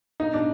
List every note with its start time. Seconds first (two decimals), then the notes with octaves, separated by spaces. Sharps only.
0.20 D#4
0.33 D4